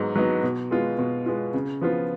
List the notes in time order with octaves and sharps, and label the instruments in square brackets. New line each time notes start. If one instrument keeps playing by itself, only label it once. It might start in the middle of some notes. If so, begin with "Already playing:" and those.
Already playing: [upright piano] G#2 F#3 B3 D#4
F#3 B3 D#4
B2
G#3 B3 F4
B2
G#3 B3 F4
C#3
F3 B3 F4